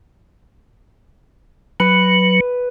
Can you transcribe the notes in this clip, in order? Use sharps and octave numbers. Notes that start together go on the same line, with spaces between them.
F#3 B4